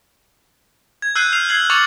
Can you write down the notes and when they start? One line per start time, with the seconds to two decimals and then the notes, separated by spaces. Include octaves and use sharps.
1.02 G#6
1.16 E6 F#6 G6 C7 D#7
1.32 F6 C7 F7
1.49 G#6 C7 F#7
1.70 C#6 D6 A6 C#7 F7 F#7